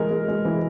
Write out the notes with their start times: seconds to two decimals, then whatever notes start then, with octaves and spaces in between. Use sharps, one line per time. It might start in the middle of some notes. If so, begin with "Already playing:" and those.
Already playing: E3 G#3 A#4
0.11 G#3
0.28 G#3
0.45 E3